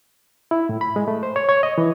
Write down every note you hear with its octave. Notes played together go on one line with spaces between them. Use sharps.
E4
A2
B5
G#3
A3
C5
C#5
C#5
D#5
E3